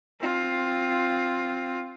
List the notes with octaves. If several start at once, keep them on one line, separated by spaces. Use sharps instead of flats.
C4 F4